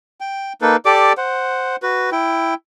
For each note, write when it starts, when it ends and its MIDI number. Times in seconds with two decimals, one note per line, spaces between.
0.20 0.53 79
0.62 0.76 58
0.62 0.76 63
0.62 0.76 69
0.62 0.76 71
0.85 1.13 67
0.85 1.13 69
0.85 1.13 74
0.85 1.13 86
1.18 1.76 72
1.18 1.76 78
1.82 2.10 66
1.82 2.10 71
2.12 2.54 64
2.12 2.54 79